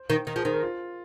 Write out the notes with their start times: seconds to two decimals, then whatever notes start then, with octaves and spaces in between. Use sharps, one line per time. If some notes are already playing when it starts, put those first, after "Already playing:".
Already playing: C5
0.10 D#3
0.27 D#3 A#4
0.36 F3 G#4
0.45 D#3 C5
0.53 A#4
0.63 F4